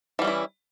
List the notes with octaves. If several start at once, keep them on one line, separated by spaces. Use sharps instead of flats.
E3 G3 C#4 E4